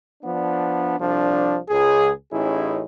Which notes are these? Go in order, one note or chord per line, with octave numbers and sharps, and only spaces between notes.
F3 B3 D4
C2 F3 D4
C#2 G#4
A1 C#4 D#4 E4 G#4